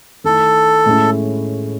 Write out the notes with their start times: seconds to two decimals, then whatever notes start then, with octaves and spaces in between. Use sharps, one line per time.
0.24 D#3 A3 E4 A4
0.86 A2 G#3 C#4 E4